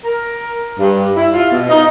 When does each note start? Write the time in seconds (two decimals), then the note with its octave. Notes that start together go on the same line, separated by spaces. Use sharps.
0.05 A#4
0.79 G2
1.16 E4
1.32 F4
1.51 B2
1.69 D#4